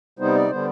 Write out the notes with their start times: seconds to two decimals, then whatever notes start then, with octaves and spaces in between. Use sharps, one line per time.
0.19 C3 G3 B3 D#4 C5
0.35 D5
0.50 D3 G3 B3 C5